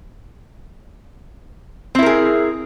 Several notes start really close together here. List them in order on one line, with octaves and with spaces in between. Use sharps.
C4 E4 A#4 G#4